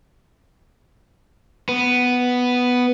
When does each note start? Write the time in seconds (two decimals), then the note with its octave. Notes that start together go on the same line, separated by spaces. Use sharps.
1.69 B3